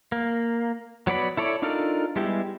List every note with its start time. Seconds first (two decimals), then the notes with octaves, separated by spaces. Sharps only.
0.12 A#3
1.07 F#3 B3 D5 B5
1.37 E4 A4 C#5 D5
1.62 D4 D#4 F4 A4 A#4
2.16 G3 G#3 B3 E4 G4